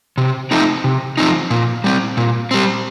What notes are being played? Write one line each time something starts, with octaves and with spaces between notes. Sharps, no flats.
C3
F3 A3 C4 D#4
C3
F3 A3 C4 D#4
A#2
G3 C4
A#2
G3 C4